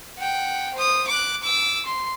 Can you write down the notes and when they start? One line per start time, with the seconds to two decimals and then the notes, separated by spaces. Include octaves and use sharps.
0.19 F#5 G5
0.74 C5 D#6
1.08 D6 F#6
1.43 D6 E6
1.85 C6